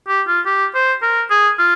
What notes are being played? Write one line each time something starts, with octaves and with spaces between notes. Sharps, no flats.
G4
F4
G4
C5
A#4
G#4
F4